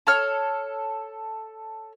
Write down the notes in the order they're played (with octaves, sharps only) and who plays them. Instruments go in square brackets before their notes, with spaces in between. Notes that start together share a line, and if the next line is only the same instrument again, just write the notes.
[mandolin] A4 C#5 F6